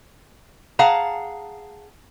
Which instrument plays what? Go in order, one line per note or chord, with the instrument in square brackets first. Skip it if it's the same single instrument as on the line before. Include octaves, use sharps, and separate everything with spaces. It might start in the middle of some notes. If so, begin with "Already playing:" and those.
[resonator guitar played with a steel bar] G#4 F5 F#5 A5 A#5